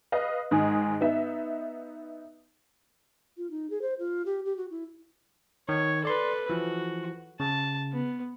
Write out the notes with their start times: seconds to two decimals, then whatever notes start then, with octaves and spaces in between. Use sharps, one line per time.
0.12 B4 D#5 F5
0.51 G#2 D#3 G#3 G#4
1.01 B3 D#4 E5
3.37 F4
3.50 D#4
3.70 G#4
3.82 C5
3.99 F4
4.25 G4
4.45 G4
4.57 F#4
4.71 E4
5.69 D#3 C#5
6.05 A4 B4 D5 C6
6.50 E3 F3 F#4
7.40 C#3 A5
7.92 B3